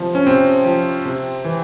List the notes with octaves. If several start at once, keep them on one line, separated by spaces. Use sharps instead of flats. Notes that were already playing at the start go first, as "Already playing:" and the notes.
Already playing: C3 F3
C#4
C3 C4
F3
C3
E3